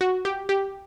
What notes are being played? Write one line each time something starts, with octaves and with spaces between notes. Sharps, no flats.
F#4
G4
G4